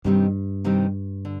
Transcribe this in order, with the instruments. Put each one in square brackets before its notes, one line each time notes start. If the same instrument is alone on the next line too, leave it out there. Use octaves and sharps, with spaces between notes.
[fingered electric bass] G2 [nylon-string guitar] C3 D#3 G3 C4 D#4
[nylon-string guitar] C3 D#3 G3 C4 D#4
D3